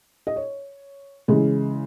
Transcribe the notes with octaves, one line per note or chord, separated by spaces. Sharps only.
D#5
C#5
C#3 E3 G#3